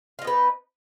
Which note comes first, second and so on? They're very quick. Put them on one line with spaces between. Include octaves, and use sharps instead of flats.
F4 D#4 B3 B4